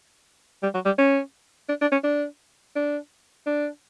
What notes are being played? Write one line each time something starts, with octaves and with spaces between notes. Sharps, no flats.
G3
F#3
G3
C#4
D4
D4
C#4
D4
D4
D4